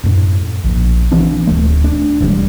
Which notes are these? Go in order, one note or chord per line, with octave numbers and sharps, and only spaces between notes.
F#2 A2
A#1
E3 B3 C4 D4
D1 A3
D4
E1 C3 G3